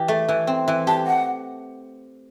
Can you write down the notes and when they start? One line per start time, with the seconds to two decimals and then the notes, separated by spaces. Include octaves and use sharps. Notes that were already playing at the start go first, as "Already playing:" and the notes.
Already playing: E3 G4
0.08 A3
0.28 E3
0.47 C4
0.68 E3
0.87 G4 A5
1.07 F#5